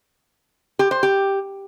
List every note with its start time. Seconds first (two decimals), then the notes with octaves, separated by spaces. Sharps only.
0.79 G4
0.91 C5
1.03 G4